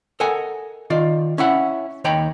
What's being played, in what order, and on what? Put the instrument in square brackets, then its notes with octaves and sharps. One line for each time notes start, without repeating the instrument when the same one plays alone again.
[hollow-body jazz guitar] A4 A#4 D#5 F#5 G#5
D#3 F4 D5
C#4 E4 F#5
D#2 D#3 C#5 G5 A#5 B5